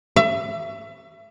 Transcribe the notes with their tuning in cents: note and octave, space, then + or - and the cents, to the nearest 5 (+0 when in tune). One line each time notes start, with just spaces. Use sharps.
E5 +30